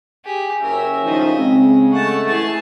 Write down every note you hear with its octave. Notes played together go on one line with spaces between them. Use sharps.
G4 G#4 G#5
F#1 C#4 A#4 E5 G5
A2 D#3 F3 D#4 D#5
C#3 G#3 C4
A3 F#5 A5 C#6
E3 G#4 A5 A6